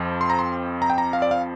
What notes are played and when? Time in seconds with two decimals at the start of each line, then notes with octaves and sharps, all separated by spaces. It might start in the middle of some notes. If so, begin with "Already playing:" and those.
Already playing: F2 F3 C4
0.21 C6
0.30 A#5
0.39 C6
0.82 A#5
0.90 G5
0.98 A#5
1.13 F5
1.22 D5
1.31 F5